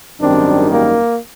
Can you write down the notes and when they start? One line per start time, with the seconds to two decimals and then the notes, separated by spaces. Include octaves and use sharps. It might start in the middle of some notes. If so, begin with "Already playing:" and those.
0.20 G#1 F#2 D#3 G3 C4 D4
0.71 A#3